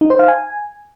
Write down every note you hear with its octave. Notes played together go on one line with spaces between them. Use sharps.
D#4
C5
F5
G#5